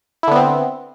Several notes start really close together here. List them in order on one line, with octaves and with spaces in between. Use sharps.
E4 D3 B3 C4